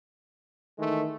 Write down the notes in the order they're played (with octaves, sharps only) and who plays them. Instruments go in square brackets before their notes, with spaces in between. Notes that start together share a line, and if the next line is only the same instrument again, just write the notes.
[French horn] D#3 [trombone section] E3 G#3 A3